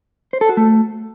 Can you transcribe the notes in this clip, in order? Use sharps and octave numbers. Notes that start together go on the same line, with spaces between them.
C5
A4
F#4
A3